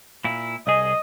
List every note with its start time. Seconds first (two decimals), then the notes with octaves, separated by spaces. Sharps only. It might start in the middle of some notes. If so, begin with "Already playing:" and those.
0.24 A#2 E4
0.67 C2 G#4 D#5